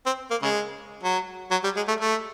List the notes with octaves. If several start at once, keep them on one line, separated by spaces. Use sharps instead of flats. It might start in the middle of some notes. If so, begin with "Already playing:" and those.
C4
A#3
C#3 G#3
F#3
F#3
G3
G#3
A3
A3